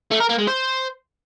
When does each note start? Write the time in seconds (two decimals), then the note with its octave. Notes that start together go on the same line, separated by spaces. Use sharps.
0.11 A3
0.21 A#4
0.30 A#3
0.39 G#3
0.48 C5